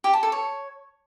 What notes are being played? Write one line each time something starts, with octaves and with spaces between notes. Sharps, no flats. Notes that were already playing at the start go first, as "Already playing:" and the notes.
G4
A5
A4
C#5